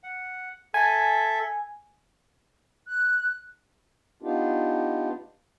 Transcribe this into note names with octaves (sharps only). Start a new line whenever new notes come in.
F#5
A4 E5 G#5
F#6
B3 D4 D#4 F4 G4